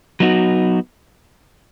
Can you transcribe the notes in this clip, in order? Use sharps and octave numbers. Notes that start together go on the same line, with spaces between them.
F#3 B3 D#4 F#4